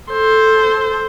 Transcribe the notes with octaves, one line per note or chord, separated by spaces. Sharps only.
A4 C5